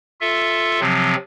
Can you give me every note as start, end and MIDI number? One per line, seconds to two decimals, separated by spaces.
0.21 0.80 65
0.21 0.80 69
0.21 0.80 76
0.80 1.15 48
0.80 1.15 53
0.80 1.15 54
0.80 1.15 60